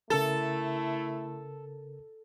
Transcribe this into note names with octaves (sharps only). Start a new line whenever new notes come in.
C#3 A3 E4 A4 A#4 A6